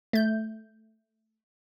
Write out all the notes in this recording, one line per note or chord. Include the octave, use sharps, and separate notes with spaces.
A3 G6